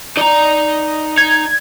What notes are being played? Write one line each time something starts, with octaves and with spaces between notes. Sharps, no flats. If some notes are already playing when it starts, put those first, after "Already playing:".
D#4 D5 A#5
D#4 G#6